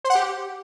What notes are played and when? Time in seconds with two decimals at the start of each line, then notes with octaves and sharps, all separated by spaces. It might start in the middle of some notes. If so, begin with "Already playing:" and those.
0.04 C5
0.10 F#5
0.15 G4